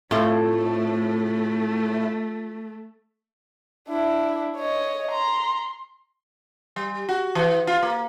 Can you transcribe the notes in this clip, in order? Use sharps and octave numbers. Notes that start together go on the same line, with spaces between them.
A2 A3 C4 F4 A4
D4 E4
C#5 D#5
A#5 C6
G3
F#4
E3
F4
A#3